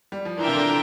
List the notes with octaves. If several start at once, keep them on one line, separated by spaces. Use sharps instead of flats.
G3
F3
E3 D4 F4 A#4 E5 G5
C3
D3